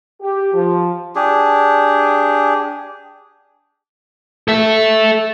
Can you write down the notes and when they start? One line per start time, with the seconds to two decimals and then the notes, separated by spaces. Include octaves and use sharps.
0.21 G4
0.53 F3
1.16 D4 G4 G#4
4.48 A4 E5